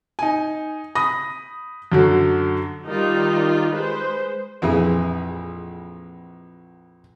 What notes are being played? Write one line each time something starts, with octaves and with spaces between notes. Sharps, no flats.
D#4 G#5
B5 D#6 A#6
F#2 D3 F#3
D#3 G3 D#4 F4 D5
G#3 B4 C5
A#1 F2 E3 E4 G#4